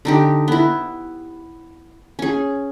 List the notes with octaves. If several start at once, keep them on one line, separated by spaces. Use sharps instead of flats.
D3 D#4 G4
B3 E4
C#4 G#4